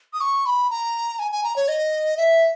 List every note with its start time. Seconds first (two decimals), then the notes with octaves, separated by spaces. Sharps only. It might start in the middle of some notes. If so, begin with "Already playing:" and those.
0.13 D#6
0.21 C#6
0.46 B5
0.70 A#5
1.19 G#5
1.31 G#5
1.44 A#5
1.56 C#5
1.68 D#5
2.17 E5